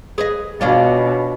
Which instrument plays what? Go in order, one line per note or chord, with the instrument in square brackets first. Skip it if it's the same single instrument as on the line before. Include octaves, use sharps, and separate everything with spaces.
[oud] G#4 B4 D#5
[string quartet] B2 [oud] C#4 D4 F4